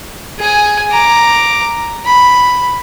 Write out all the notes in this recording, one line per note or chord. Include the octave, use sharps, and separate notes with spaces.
G#4 G#5
A#5 D6
B5